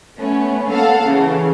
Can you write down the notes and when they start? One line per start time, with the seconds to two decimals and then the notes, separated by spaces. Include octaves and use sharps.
0.18 A3 B3 C#4
0.69 A#3 A4 F5 F#5 A5
1.02 C#3 E3